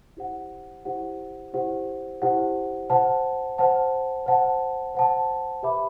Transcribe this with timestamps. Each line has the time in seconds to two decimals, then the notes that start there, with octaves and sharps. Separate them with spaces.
0.17 E4 G4 C5 F#5
0.85 E4 G4 C5 F#5
1.53 E4 G4 C5 F#5
2.22 E4 G4 C5 F#5
2.90 C5 F#5 A5
3.58 C5 F#5 A5
4.26 C5 F#5 A5
4.95 C5 F#5 A5
5.63 G4 B4 E5 B5 D6